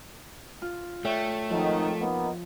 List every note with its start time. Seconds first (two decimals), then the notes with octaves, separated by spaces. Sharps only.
0.62 F4
1.05 A3 C#5 E5 G5
1.50 F2 G#2 D#3 F3
2.00 A#3 B3 D#4